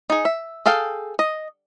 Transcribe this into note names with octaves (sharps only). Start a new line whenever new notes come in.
D#4 G#4
E5
G#4 A4 F5 G5
D#5